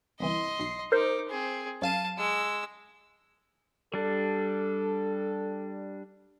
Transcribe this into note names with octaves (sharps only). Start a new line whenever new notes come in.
G1 C2 E3 D#5 C6
B1 C7
D#4 A#4 C5 D6
C4 G#4
F#2 F5 A5 D#7
G#3 E6
G3 D4 A4